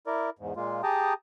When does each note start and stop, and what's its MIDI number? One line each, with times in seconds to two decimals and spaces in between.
0.07 0.30 64
0.07 0.30 70
0.07 0.30 74
0.39 0.53 40
0.39 0.53 44
0.56 0.81 46
0.56 0.81 56
0.56 0.81 58
0.56 0.81 65
0.84 1.13 67
0.84 1.13 68
0.84 1.13 79
0.84 1.13 81
0.84 1.13 82
0.84 1.13 87